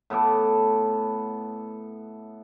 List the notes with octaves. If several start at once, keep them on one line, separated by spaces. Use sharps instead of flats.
A2 B3 A4 D6